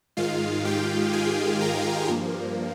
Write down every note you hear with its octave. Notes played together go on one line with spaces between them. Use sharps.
G#2 D#3 G#3 F4 F5
G4 G5
G#4 G#5
A#4 A#5
G2 F3 A#3